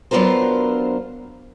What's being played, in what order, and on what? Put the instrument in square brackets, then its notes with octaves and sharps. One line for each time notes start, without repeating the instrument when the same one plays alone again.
[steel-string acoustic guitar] F#3 B3 D4 F4 A#4 C5